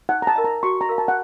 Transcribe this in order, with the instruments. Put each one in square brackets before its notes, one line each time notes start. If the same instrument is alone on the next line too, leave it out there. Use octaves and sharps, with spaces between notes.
[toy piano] D#4 [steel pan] F#5
[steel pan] A#5
A5
[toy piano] A#4 D#5
[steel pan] A#5
[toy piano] F#4 [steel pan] C#6
[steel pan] A#5
[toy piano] A#4 F5
[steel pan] A5
F#5